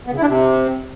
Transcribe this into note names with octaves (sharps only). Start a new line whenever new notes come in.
B3
C#3
E4
D4
C3